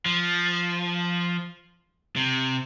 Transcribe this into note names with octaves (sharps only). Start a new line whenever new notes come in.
F3
C3